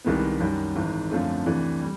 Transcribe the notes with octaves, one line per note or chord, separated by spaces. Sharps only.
C2 C3 D#3 G#3 B3
F#2 D#3 G3
G#1 G#2 E3
F#2 D3 F3 A3 C4
D2 C3 E3 A3 D4
G3